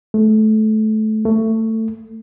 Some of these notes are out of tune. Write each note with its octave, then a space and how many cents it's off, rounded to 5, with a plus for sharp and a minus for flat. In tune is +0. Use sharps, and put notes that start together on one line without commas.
A3 -20
A3 +20